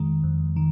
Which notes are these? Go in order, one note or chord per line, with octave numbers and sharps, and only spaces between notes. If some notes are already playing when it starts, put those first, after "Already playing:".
Already playing: F2 D#3 G#3
F2
D#3